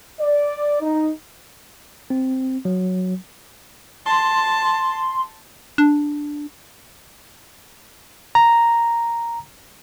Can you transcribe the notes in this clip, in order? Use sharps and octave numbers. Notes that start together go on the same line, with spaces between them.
D5
D#4
C4
F#3
A5 C6
D4
A#5